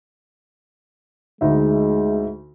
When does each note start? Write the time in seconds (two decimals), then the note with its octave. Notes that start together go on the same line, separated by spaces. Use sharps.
1.41 D2 G#3 D#4 E5